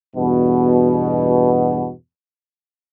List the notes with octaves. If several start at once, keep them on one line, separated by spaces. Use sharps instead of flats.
E2 G2 B2